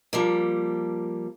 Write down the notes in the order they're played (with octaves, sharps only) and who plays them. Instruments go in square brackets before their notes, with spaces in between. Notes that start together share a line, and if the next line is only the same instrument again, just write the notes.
[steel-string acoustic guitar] F3 G3 A#3